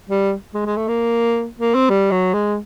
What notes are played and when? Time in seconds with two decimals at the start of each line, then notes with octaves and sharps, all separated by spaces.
0.09 G3
0.54 G#3
0.66 G#3
0.76 A3
0.88 A#3
1.59 A#3
1.74 C4
1.89 G3
2.11 F#3
2.33 G#3